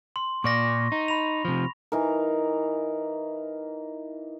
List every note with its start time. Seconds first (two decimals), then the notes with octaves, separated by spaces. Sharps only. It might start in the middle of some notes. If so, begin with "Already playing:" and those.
0.16 C6
0.44 A#2 D5 C#6 A#6
0.92 D#4
1.08 B5 F7
1.45 C3 F3
1.92 E3 D#4 A#4